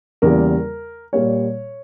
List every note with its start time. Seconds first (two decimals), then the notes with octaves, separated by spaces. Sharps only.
0.22 E2 C#3 G3 A#3 A#4
1.13 A#2 G3 A#3 C#5